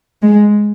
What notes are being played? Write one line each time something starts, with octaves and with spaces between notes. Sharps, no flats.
G#3